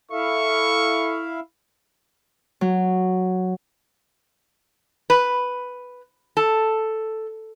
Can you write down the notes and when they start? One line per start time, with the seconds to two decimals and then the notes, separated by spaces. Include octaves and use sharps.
0.11 E4 A4 E5 F5 C#6
2.61 F#3
5.10 B4
6.37 A4